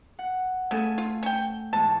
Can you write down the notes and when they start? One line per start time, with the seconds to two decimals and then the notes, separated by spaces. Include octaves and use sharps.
0.19 F#5
0.71 C#3 A3 A4 G#5
0.98 F4
1.23 C#4 G5
1.73 E2 G#2 A5